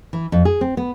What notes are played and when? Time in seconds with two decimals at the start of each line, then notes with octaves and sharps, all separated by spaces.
0.13 E3
0.32 F2
0.45 G#4
0.61 C4
0.77 B3